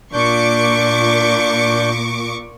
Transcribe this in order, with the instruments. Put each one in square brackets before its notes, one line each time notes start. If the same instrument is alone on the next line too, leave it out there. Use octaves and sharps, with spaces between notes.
[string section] A#2 C#6 D6 [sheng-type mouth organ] D4 G6